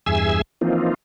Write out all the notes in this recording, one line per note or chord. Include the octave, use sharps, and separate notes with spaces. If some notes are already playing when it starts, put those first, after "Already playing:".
E2 G2 G#4 E5 G#5 E6
E3 F3 A#3 C4 D#4 F4